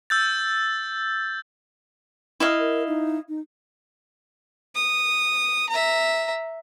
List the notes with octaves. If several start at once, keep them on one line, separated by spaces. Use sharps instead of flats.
E6 G6 A6
E4 D#5 F5
A#4
D#4
D#4
D#6
E5 A#5